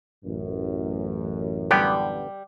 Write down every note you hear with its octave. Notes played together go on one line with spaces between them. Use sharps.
A1 F#2
D3 G3 B3 G4